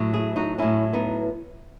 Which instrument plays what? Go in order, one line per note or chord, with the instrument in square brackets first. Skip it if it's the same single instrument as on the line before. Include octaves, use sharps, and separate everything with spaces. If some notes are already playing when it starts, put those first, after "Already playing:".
Already playing: [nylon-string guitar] A2 F#3
E4 G#4
D#4 F#4
A2 F#3 C#4 E4
B3 D#4